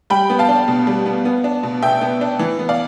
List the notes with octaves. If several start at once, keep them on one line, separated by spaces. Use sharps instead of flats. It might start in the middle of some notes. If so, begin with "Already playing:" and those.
G3 G5 B5
B3
F5 A5
D4
B2
G3
B3
B3
D4
B2
B2 E5 G5
B3
D4
E3
B3
D5 F5